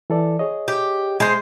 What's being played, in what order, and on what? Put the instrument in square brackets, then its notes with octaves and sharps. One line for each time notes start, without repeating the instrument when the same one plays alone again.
[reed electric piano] E3 A4 D5
G#4 C#5 D#5
[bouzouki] G4
G#3 C5